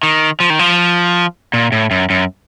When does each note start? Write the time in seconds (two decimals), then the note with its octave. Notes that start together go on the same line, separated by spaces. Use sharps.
0.03 D#3
0.40 F3
0.50 D#3
0.59 F3
1.53 A#2
1.72 A2
1.91 F#2
2.10 F#2